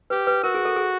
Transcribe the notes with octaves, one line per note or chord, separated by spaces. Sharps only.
G4 B4
B4
F#4 A#4
G#4
A4
G#4